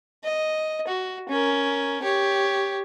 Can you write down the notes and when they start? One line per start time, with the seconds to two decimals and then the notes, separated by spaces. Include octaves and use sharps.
0.24 D#5
0.87 F#4
1.29 C#4 A#4
2.03 G4 C#5